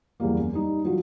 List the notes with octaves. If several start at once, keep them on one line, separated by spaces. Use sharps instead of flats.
E2 F#3 G3 A#3
F#2
G3 D#4
E3 F#3 G3 F4 F#4